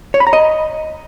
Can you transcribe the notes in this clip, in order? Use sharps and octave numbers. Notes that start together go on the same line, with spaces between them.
C#5
B5
A#5
D#5